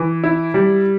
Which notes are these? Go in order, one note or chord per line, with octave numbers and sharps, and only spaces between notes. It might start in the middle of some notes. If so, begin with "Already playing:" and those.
Already playing: E3
E4
G3